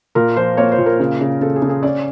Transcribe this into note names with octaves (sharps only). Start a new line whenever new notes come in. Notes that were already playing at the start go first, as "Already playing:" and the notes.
A#2 A#4
F3 C5
A#3 C#5
C5
A#2
A#4
C#3
C#3
C#3 A4
G#4
C#3
G#4
C#4 D5